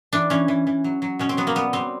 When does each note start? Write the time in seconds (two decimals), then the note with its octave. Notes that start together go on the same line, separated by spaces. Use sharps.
0.13 E3 D4
0.30 E3 C#4
0.48 E3
0.67 E3
0.84 F#3
1.02 F#3
1.19 B2 C#4
1.29 C4
1.37 F#3 B3
1.47 A#3
1.55 G3 B3
1.73 G3 C4